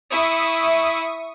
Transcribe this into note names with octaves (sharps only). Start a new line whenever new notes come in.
E4 E5 C#6 D#6